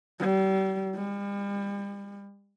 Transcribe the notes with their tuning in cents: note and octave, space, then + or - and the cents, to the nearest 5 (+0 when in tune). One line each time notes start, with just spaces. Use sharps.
G3 -35
G3 +40